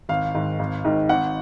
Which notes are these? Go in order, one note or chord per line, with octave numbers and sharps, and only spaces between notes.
G#1 F5
G#2 D#3
G#1
G#2 D#3
G#1 F#5